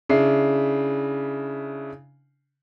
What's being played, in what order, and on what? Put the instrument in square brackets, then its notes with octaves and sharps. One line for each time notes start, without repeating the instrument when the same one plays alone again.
[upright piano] C#3 D4 E4 C7